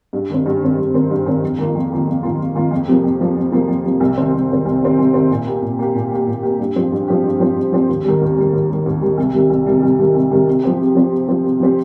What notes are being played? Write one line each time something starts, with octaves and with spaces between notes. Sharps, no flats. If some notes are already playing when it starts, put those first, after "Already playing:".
G2
D#3 C4
G2
D#3 C4
G2
D#3 C4
G2
D#3 C4
F2
D#3 A#3 F4
F2
D#3 A#3 F4
F2
D#3 A#3 F4
F2
D#3 A#3 F4
F2
C3 F3 A#3
F2
C3 F3 A#3
F2
C3 F3 A#3
F2
C3 F3 A#3
C2
C3 D#3 C4
C2
C3 D#3 C4
C2
C3 D#3 C4
C2
C3 D#3 C4
A#2
A#3 G4
A#2
A#3 G4
A#2
A#3 G4
A#2
A#3 G4
G2
F3 C4 G4
G2
F3 C4 G4
G2
F3 C4 G4
G2
F3 C4 G4
D#2
D#3 G3
D#2
D#3 G3
D#2
D#3 G3
D#2
D#3 G3
C2
C3 D#3 G3
C2
C3 D#3 G3
C2
C3 D#3 G3
C2
C3 D#3 G3
C3
F3 C4 G4
C3
F3 C4 G4
C3
F3 C4 G4
C3
F3 C4 G4